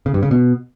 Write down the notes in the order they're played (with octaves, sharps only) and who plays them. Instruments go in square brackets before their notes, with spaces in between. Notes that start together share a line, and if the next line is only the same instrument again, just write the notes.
[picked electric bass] C#3
G2
C#3
B2